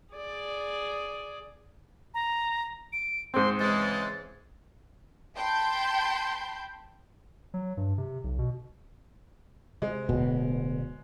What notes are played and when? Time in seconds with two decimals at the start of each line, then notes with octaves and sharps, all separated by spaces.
0.14 G#4 D5
2.14 A#5
2.93 D7
3.34 G#2 C4 C6
3.60 C#3 E3 G#3 A6
5.36 G5 A5 B5 C6 G6
7.54 F#3
7.77 G2
7.98 C3
8.24 B1
8.39 B2
9.82 C3 G#3
10.09 D1 B2